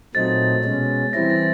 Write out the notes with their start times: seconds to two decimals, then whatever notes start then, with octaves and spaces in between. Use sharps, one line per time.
0.15 A#2 F#3 A3 C4 D#4 A6
0.64 B2 G#3 C#4
1.13 E3 G3 C4 E4 A#6
1.30 A6